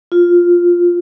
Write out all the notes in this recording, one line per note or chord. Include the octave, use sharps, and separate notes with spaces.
F4